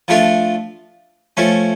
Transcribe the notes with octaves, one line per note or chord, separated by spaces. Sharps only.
F3 A3 D4 F4
F3 A3 C#4